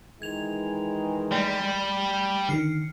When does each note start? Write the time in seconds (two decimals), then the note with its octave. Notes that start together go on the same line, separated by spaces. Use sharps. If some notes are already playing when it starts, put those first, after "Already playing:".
0.22 D#3 E3 G#3 G#6 F7
1.32 G3 A3 G5
2.49 D3 D#3 F6 C7 C#7